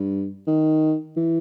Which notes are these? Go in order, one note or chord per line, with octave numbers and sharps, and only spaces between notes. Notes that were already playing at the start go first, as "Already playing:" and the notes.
Already playing: G2
D#3
E3